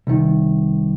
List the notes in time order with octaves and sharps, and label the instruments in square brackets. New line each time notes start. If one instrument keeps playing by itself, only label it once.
[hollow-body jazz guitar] C2 D#3